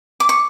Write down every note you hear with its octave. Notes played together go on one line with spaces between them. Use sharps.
D6
C#6